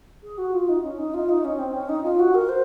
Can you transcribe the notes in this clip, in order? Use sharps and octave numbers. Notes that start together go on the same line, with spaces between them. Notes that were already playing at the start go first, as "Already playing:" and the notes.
G#4
F#4
F4
D#4
C#4
D#4
F4
D#4
C#4
C4
C#4
D#4
F4
F#4
A#4
C5